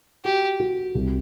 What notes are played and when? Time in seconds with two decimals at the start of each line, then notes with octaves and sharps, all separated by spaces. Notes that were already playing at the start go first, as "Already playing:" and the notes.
0.25 F#4 G4
0.60 F#4
0.95 C2